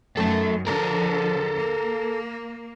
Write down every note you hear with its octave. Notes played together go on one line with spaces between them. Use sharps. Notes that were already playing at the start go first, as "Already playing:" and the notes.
F#2 D#3 A3 A4
D3 F3 A4 A#4
A#3